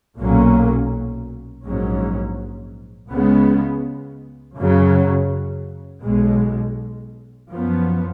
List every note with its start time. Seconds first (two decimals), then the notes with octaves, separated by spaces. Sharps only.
0.17 B1 A#2 F#3 A#3 C#4
1.64 A#1 G#2 F#3 C#4
3.10 C#2 C#3 G#3 B3
4.56 F#2 C#3 F#3
6.03 B1 B2 G#3
7.49 F#2 F3 B3